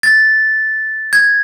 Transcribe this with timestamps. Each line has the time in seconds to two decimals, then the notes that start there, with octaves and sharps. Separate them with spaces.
0.03 A6
1.13 G#6